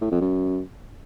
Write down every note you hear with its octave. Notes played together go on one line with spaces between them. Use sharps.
A2
F2
F#2